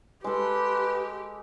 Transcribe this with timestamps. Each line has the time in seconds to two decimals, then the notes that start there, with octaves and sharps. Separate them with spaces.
0.24 G#3 G4 A4 B4